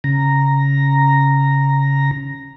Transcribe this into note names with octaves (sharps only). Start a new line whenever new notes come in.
C#3 A#5